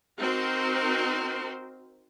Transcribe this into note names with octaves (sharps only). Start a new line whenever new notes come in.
C4 D#4 F#4 A#4 C5